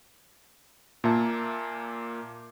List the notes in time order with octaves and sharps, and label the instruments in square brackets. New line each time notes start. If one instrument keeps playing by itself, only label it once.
[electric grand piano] A#2 A#3 E5 A5